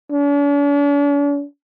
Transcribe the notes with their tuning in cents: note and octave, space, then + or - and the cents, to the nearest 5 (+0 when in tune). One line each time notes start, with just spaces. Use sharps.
D4 -45